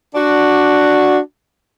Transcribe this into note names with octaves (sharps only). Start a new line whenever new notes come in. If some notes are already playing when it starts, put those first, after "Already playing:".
D4 F#4